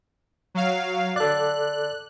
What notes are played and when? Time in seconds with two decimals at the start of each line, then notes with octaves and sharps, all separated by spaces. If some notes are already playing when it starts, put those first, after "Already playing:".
0.55 F#3 F5
1.16 A4 D5 F#6